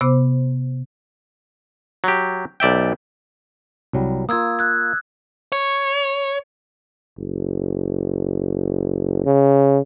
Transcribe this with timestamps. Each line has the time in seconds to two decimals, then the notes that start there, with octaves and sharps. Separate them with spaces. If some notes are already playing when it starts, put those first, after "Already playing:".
0.01 C3 B3 C5 D6
2.04 F#3 G4
2.60 B1 D5 E5 G5
3.93 C2 F#3 G3
4.29 A#3 F4 D#6 E6 G#6
4.59 F#6 G#6
5.52 C#5
7.18 F#1
9.26 C#3